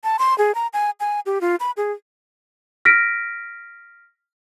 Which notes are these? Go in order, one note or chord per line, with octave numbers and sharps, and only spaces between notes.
A5
C6
G#4
A#5
G#5
G#5
G4
F4
B5
G#4
F6 A#6 B6 D7